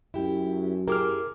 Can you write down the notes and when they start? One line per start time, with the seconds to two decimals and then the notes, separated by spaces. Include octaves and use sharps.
0.14 F#2 E4 G4
0.88 E4 G4 G#4 A#4 D6 F6